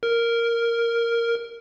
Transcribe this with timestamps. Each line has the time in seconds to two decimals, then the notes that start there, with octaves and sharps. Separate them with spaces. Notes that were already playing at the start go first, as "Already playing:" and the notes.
0.03 A#4